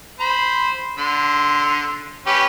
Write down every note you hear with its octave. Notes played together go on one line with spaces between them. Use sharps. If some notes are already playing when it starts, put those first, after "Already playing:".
C5 B5
D3 C6
C#4 G4 B4